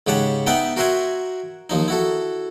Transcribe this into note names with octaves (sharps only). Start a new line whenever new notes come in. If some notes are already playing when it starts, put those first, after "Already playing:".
G#2 C#3 G4 F#5 A5
B3 D#4 E5 F#5 G5 A5
F#4 A#4 C5 E5 F#5 G#5
D#2 F3 D#4
E4 F#4 A4